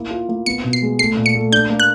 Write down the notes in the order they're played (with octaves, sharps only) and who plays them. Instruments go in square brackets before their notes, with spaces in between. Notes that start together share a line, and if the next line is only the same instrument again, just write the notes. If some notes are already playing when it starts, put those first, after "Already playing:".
Already playing: [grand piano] A#3 E4
F4
A#3
[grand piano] B3 [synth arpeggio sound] C#7
[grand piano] B2
[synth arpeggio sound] C7
[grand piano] G#3
[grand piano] A3 [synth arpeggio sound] C7
[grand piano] A#2
[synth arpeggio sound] C#7
[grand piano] A3
[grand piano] D4 [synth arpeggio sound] G6
[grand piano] A#3
[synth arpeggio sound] F#6